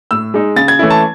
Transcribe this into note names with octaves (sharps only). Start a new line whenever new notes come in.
A2 E6
G#3 D#4
C#3 A6
G#6
E3 A3 C#4 E4
A5